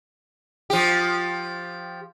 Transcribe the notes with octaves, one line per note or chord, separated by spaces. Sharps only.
F3 G4